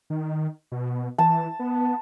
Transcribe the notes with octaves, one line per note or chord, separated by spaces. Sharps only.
D#3
B2
E3 A5
B3